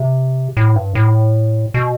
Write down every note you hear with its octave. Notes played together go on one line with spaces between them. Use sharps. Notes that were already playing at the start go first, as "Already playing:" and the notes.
Already playing: C3
A2
G2
A2
B2